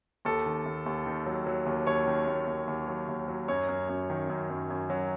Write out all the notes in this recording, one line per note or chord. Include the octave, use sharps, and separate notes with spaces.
D#2 A4
D#3
D#2
D#2
D#3
F#3
F#3
D#2
D#2 C#5
D#3
D#2
D#2
D#2
F#3
D#2
F#3
F#2 C#5
F#2
F#2
D#3
F#2
F#2
F#2
F#3